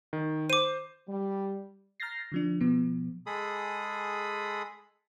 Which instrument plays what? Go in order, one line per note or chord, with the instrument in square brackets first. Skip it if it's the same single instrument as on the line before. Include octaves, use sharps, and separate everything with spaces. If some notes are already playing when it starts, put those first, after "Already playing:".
[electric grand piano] D#3
[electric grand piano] C5 [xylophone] D6 D#7
[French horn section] G3
[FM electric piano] A#5 F6 G6 A6 A#6 C7
D3 F3 D4
B2 F3 B3
[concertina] G#3 G#4 A4 B5 D#6